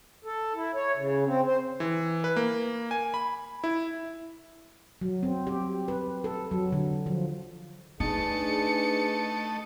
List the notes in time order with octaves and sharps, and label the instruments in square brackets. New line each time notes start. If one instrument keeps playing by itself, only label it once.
[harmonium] A4
E4
C#5
C#3
C4
C5
[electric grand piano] E3
B4
A#3
G#5
B5
E4
[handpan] F#3
C4
G4
B4
A4
F#3
D3
F3
[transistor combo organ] A3 D#5 A5 [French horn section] D4 G#4 B4 [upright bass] D#4 [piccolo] C#7